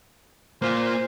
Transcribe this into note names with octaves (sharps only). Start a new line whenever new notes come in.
A#3 F4 C5